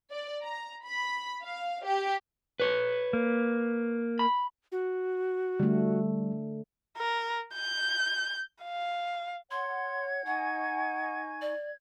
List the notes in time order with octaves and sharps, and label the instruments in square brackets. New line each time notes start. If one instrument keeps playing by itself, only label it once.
[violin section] D5
A#5
B5
F5
G4
[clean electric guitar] B4 C#5
[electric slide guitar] A#3
[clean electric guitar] B5
[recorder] F#4
[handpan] D3 A3 [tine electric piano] G3
[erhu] A#4
G6
F5
[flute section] C#5 F#5 [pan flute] C6 [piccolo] G#6
[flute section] D#4 G#5 C#6 [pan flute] F#5
[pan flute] D5